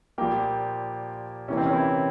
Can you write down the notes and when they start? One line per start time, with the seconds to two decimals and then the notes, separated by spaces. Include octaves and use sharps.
0.18 A#2 F3 G3 A#3 G4
1.48 C3 E3 A#3 C#4
1.57 C4
1.66 C#4
1.73 E3 E4